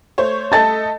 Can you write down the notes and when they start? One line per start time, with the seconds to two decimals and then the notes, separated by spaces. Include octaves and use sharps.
0.18 A3 C5 C#5
0.52 A3 A4 D#5 A5 A6